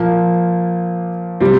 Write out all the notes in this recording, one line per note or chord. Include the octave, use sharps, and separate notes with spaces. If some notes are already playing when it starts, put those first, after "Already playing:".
Already playing: A#2 F3 A#3
C3 G3 C4